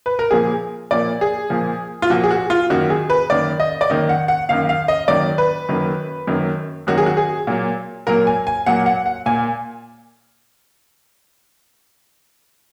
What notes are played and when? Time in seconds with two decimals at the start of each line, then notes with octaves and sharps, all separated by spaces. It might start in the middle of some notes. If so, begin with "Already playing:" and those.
0.06 B4
0.19 A#4
0.31 A#2 F3 A#3 G#4
0.91 A#2 F3 A#3 D5
1.21 G#4
1.50 A#2 F3 A#3
2.02 F4
2.10 A#2 F3 A#3 F#4
2.24 G#4
2.31 F#4
2.50 F4
2.70 F#2 D#3 A#3 F#4
2.90 G#4
3.10 B4
3.30 F#2 D#3 A#3 D5
3.60 D#5
3.81 D5
3.89 F#2 D#3 A#3 D#5
4.09 F#5
4.28 F#5
4.49 F#2 D#3 A#3 F5
4.69 F5
4.88 D#5
5.08 F#2 D#3 F#3 A#3 D5
5.38 B4
5.69 F#2 D#3 F#3 A#3
6.27 F#2 D#3 F#3 A#3
6.87 F#2 D#3 F#3 A#3 F#4
6.98 G#4
7.06 F#4
7.17 G#4
7.47 A#2 F#3 A#3
8.07 A#2 F#3 A#3 A#4
8.27 G#5
8.47 G#5
8.66 A#2 F#3 A#3 F#5
8.86 F#5
9.06 F#5
9.26 A#2 A#3 G#5